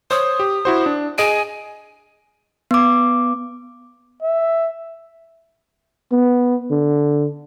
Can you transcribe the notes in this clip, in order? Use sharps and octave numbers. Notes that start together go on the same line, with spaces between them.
C5 C#5 D#6
G4
E4 F#4 C5
D4
G#4 D#5 G#5 D7
B3 D6
E5
B3
D3